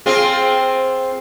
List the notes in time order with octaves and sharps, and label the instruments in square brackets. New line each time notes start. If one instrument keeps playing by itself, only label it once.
[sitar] C4 F4 G#4